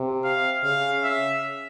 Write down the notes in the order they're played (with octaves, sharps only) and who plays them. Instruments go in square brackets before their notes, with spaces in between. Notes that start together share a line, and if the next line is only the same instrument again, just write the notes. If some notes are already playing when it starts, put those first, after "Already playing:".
Already playing: [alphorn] C3
[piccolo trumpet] F5
[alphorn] C#3 [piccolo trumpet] F5
[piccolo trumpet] E5